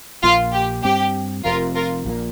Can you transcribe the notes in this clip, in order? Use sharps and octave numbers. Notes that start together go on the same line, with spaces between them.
A#1 A#2 A#3 F4
G4
G2 G3 C4 G4
F1 F2 C3 F4 A#4
F4 A#4
A#1 A#2 A#3